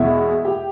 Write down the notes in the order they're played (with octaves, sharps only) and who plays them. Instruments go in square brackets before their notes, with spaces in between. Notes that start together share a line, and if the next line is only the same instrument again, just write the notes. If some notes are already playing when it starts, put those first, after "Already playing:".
Already playing: [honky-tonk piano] E2 B2 G#3 B3 E4 E5
G4 G5